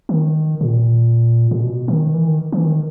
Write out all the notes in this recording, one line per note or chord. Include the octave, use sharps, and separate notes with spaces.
D#3
A#2
A#2
B2
D#3
E3
D#3
E3
D#3